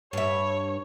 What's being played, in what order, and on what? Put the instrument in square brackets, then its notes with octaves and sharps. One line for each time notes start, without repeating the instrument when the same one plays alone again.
[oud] G2 E5 [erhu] C#5